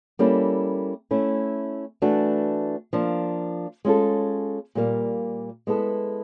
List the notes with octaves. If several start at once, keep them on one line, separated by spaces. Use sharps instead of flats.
G3 A#3 C#4 E4 A4
A3 C#4 E4
E3 A3 D4 F#4
F3 A#3 D4
G#3 C#4 F4 A4
A#2 G3 A#3
G#3 B3 E4 A4